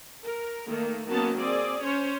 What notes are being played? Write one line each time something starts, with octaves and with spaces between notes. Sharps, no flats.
A#4
D#3 A3 A#3
D#3 F#3 A#3 B3 C#4 A5
C4 G#4 D5
C#4 C5 C#5